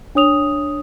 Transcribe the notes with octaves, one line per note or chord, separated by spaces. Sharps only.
D4 C#5 D#6 F7